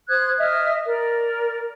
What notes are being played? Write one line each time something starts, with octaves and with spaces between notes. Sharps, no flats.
C5 D#6 F#6 G#6
D#5 E5 D#6 F6
A#4 D5